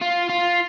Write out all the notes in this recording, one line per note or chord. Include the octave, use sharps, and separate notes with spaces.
F4
F4